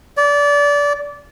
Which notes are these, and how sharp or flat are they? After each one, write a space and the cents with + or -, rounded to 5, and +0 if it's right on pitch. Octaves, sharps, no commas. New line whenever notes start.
D5 -25